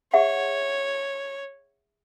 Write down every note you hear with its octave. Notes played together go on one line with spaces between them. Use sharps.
G#4 C#5 E5 F#5